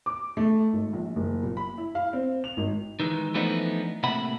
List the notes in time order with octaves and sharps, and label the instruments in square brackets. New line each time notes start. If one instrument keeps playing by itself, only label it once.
[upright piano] D6
A3
G#1
A#1
F#1
A#2
B5
E4
F5
C4
F7
G#1
[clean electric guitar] D#3 E3 G#3
E3 F3 A3 B3 D4 D#4
A2 C3 A#3 E5 F#5 B5